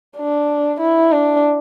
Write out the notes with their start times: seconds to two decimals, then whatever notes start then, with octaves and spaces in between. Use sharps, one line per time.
0.17 D4
0.80 E4
1.12 D4